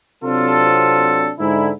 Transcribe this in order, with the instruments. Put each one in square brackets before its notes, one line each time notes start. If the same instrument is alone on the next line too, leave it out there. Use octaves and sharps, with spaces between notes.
[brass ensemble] C3 F#3 C4 D4 F4 A4
G#2 D3 E4